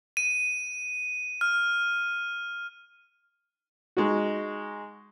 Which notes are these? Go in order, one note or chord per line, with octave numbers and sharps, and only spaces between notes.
D#7
F6
G#3 D#4 F#4